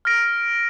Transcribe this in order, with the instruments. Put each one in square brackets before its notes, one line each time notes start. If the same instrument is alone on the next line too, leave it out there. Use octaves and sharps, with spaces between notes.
[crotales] F6 A#6 D7